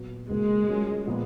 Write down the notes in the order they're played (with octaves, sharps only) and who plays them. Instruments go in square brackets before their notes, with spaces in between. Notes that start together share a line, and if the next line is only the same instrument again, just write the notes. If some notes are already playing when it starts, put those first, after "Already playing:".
Already playing: [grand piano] A#2 F#3 B3
[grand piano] C#2 B2 A#3 [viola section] G#3
[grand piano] F#3 C#4 F4 A#4
A#2 F3 B3